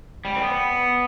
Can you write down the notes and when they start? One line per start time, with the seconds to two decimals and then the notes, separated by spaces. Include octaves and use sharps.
0.25 G3
0.36 C4
0.42 B3